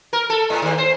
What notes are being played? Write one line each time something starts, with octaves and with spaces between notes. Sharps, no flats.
A#4
A4
A2
D#2
C5